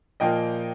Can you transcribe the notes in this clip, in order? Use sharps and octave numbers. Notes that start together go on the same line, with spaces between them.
A#2 F3 A#3 D#5 G5